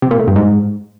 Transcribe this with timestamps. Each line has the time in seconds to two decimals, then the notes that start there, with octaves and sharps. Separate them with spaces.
0.02 C3
0.11 A#2
0.19 A2
0.28 G2
0.36 G#2